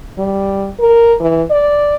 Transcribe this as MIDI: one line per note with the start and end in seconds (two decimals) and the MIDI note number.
0.19 0.69 55
0.80 1.14 70
1.20 1.42 52
1.51 1.96 74